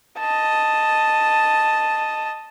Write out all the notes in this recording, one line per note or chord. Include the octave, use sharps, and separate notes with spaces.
D#5 A5